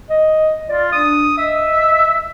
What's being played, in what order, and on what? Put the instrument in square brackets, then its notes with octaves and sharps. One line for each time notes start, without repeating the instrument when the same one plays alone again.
[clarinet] D#5
[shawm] F4 [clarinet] D5
[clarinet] D4 [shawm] D#6
[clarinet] D#5 [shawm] E5